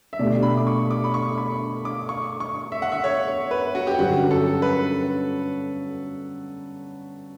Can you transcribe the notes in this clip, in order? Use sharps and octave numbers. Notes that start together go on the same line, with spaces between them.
E5
B2 A3 D4 G4 D5
B5
D6
C#6
D6
B5
C#6
B5
D6
C#6
C#6
E5
F#5
E5
C#5
C#5
B4
F#4
G4
G2 D3 F#3 C#4 F#4
A4
B4